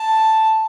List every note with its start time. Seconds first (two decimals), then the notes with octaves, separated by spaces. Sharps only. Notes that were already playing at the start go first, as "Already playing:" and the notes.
Already playing: A5